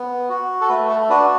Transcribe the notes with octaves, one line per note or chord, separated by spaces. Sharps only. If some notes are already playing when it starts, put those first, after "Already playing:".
Already playing: B3
F#4
A4
A3 B4
A4
D4 F#4 B4